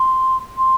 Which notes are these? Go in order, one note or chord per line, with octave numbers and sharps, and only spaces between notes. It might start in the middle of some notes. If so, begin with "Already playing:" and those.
Already playing: C6
C6